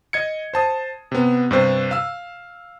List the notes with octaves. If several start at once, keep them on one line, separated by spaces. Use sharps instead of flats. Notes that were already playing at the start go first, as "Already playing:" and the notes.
D#5 G#6 C#7
C5 A5 D#6
C3 B3
G2 C3 C5
F5 E6